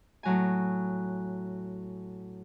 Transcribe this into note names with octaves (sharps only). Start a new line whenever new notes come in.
A2 F#3 G#5